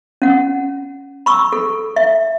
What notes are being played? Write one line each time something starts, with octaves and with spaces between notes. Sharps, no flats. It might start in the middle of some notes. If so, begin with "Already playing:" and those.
C#4 F#5
B5 C#6 E6
A4
E5